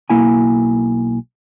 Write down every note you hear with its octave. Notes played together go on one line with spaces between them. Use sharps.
B1 A#3 E4 G#5